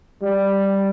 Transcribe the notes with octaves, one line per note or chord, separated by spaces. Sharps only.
G3